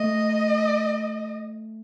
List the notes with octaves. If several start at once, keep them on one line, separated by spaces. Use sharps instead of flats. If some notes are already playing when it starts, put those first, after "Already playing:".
Already playing: A3 D#5